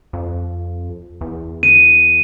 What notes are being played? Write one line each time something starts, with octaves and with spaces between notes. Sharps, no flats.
F2
E2
D#7